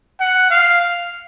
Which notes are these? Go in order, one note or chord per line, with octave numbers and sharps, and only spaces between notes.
F#5
F5